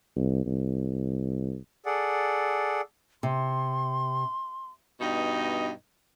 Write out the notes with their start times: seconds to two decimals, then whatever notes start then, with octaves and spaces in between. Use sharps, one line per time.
0.16 C2
0.46 C2
1.86 G#4 A4 D5 F#5
3.23 C3 C6
5.00 G2 B2 D#4 D#5